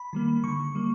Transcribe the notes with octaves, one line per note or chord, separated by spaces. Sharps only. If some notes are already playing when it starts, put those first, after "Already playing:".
Already playing: B5
D#3 G3 A#3
D3 C#6
G3 A#3